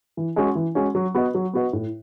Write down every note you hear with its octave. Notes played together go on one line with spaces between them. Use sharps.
E3
G#3 C#4 F#4
E3
G#3 C#4 F#4
F#3
B3 F#4 B4 D#5
F#3
B3 F#4 B4 D#5
A2